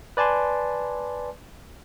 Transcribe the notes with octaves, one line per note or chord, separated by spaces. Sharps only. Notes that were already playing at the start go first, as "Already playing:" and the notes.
B4 D5 G#5 A5 C6